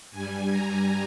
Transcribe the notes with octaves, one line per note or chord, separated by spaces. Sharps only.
G2 G3 G#5
A#5